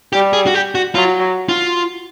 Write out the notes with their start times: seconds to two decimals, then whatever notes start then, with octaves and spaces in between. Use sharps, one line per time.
0.13 G3 G4
0.33 G#4
0.46 F#4
0.54 G4
0.75 F#4
0.95 F#3 F4
1.49 F4